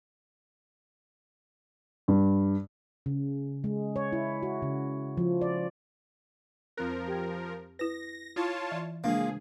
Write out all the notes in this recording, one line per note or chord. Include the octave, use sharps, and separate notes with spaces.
G2
C#3
G#3
C#5
E4
F#4
C#3
F3
D5
F2 F3 C4 A#4 F#6
G4 G5 G#6
E4 B4 A#6
E4 F4 C#5 A5
E3 D5 E5
C#3 F3 G#3 A#3 D4 G#4